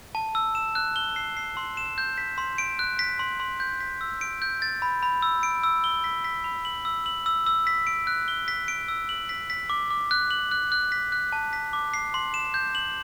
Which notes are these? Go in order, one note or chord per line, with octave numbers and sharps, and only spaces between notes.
A5
E6
E7
F#6
G7
C7
C7
C6
E7
G6
B6
C6
D7
F#6
B6
C6
C6
G6
B6
E6
D7
G6
A6
B5
B5
E6
D7
E6
G7
B6
B6
B5
F#7
E6
F#7
E6
E6
B6
D7
F#6
G7
B6
D7
E6
F#7
B6
B6
D6
D6
F#6
F#7
F#6
F#6
B6
F#6
A5
B6
D6
C7
C6
E7
G6
F#7